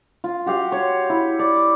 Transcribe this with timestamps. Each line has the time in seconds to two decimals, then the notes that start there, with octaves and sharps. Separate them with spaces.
0.24 F4
0.46 F#4 G4 F5 G5
0.72 C#5 C6
1.10 E4
1.39 D5